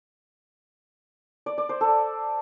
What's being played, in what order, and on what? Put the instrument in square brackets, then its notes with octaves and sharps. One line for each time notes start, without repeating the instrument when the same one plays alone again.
[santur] D5
D5
C5
A4